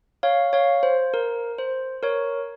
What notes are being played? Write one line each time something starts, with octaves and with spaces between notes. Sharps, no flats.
C#5 F5
C#5 F5
C5
A#4
C5
A#4 C#5